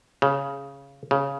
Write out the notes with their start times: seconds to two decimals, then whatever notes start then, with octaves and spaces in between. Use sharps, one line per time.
0.22 C#3
1.11 C#3